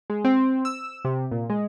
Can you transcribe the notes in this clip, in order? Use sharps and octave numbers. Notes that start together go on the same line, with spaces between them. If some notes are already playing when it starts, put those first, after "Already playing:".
G#3
C4
E6
C3
A#2
G#3